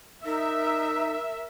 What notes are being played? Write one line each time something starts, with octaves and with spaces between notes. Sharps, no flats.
D#4 A#4 E5